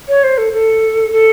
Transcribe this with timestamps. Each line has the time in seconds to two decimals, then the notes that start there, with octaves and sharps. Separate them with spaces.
0.09 C#5
0.24 C5
0.38 A4
0.53 A4
1.12 A4